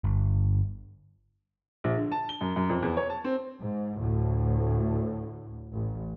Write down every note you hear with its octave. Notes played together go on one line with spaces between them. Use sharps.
G1
A#1
D3
A5
G7
F#2
F#2
F2
E2
C#5
A5
C4
G#2
D2 A2
A1